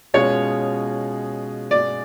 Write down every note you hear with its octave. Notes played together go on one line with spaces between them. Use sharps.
B2 G#3 C#4 F4 G#4 C#5
D5